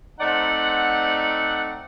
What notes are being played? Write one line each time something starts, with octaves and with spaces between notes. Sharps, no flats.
A3 C4 D#4 D5 F#5